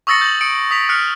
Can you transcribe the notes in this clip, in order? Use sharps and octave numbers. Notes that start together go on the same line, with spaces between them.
C#6 D#6 E6 A6 A#6 C#7
E6 G6 A6 F#7
D#6 C#7 D7
D#6 B6 F7
D#6 F6 F#6 B6 C#7 D7